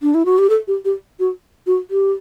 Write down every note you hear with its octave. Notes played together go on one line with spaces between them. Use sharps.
D4
E4
F#4
G4
A4
G4
G4
F#4
F#4
G4